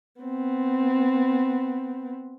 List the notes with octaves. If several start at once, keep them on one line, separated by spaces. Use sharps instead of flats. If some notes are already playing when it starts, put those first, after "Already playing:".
B3 C4